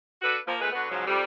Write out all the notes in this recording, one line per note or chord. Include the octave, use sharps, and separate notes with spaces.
D4 F#4 A4 B4
F3 A#3
A#2 G#3 A3 G#4 B4
D3 B3 F#4 B4
G#2 C#3 F3 F#3
F2 G3